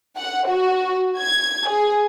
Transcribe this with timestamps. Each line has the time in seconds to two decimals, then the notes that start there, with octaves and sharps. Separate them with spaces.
0.18 F#5
0.49 F#4
1.20 G#6
1.70 G#4